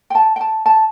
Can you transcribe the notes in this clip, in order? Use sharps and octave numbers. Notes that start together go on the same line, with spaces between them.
G5
A5
G5
A5
A5